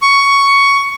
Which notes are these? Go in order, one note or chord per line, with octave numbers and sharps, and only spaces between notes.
C#6